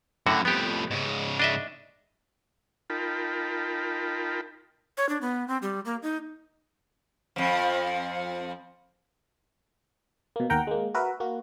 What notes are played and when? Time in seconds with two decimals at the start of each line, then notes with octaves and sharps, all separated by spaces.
0.26 F#2 A2 D3 F#4
0.45 F2 A2 B3 G4
0.91 G#2 C#3
1.40 D4 D#5 E5
2.90 D#4 F4 A#4 G5 A5 B5
4.98 C#5
5.09 D4
5.22 B3
5.48 C4
5.62 G3
5.85 A#3
6.03 D#4
7.36 F2 F3
10.36 B2 A#3
10.50 D#2 A#4 F#5 G5 A#5
10.67 G#3 A#3
10.94 F#4 A#4 B4 E5
11.20 A#3 F#4